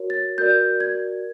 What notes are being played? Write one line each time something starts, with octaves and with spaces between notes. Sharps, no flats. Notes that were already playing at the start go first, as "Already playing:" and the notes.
Already playing: F#4 A#4 C#5
A6
F#4 A#4 D5 G6
G#6